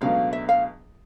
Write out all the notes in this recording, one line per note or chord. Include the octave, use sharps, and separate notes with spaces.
C#2 B2 F#3 A3 D4 F5
E5
F5